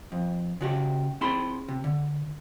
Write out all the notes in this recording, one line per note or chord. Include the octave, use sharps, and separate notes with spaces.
F2
C#3 F#4 G4
C4 E4 G#4 A5 B5 C6
C3
D3